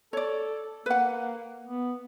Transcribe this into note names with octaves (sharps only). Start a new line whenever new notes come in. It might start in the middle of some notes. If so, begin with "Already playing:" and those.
A4 C#5 D5
A#3 B4 F#5
B3